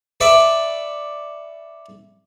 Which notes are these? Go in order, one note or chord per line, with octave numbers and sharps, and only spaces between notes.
B4 D5 E5 C#6